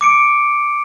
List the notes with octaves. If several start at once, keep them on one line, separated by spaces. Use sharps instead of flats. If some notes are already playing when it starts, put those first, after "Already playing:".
D6 C#7 D7